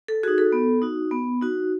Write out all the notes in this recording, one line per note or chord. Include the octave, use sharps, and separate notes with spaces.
A4
D#4 F#4 G#4
A4
B3
D#4 F#4
B3
D#4 F#4